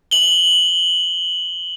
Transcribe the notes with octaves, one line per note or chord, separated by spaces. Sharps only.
F#7 G7